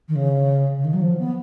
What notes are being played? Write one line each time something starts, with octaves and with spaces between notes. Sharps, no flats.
D#3
C#3
C#3
D#3
F#3
F3
B3